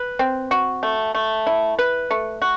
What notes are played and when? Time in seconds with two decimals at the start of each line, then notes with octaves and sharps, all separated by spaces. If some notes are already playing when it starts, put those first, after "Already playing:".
Already playing: B4
0.19 C4
0.51 F#4
0.83 A3
1.15 A3
1.47 E4
1.78 B4
2.11 A3
2.42 F#4